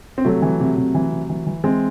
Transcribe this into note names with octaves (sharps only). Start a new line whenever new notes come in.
C4
C3 F#3 A3
E3
C3
C3
E3
C3
E3
E3
E3 G#3 C4